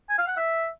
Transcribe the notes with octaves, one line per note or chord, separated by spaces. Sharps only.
G#5
F5
F#5
E5